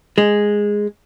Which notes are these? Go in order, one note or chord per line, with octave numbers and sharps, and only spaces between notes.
G#3